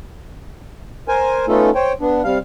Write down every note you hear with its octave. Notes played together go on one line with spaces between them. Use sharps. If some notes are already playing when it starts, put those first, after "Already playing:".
A#4 C5 G#5
A3 B3 C#4 D#4 F4 A4
C5 C#5 G5
B3 D4
C3 G3 F5